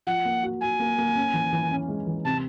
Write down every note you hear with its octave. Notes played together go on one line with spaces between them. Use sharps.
F3 F#5
A#3
F#4
F#4 G#5
A#3
A#3
C#4
E3
E3
C#4
G#3
E3
C3 A5